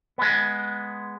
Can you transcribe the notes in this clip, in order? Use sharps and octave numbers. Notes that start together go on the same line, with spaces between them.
G#3 B3